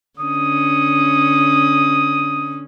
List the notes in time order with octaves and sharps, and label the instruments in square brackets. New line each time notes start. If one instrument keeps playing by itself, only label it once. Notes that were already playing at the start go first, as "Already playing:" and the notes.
[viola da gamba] D3 C#4 [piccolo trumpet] D#6